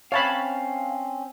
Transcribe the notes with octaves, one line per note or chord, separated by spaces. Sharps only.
C4 C#4 C#5 F5 A5 B5